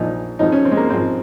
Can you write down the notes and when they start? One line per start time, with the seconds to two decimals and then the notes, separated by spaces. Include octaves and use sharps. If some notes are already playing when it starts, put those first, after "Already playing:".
Already playing: A#1 A#2 F3 D#4
0.39 G#1 G#2 F3 D#4
0.52 C#4
0.65 C4
0.71 G#3
0.77 A#3
0.90 G#1 G#2 F3 C4